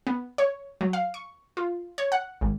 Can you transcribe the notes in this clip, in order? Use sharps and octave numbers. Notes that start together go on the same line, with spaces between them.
B3
C#5
F#3
F5
C#6
F4
C#5
F#5
G#1